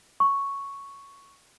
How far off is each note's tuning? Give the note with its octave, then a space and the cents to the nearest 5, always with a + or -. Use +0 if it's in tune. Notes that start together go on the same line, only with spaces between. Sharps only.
C#6 +0